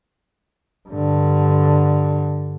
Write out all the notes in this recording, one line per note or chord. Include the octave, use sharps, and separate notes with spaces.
G2 D3